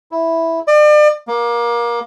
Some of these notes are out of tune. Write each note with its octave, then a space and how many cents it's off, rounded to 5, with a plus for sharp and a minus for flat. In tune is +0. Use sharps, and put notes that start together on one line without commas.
E4 -5
D5 +40
A#3 +25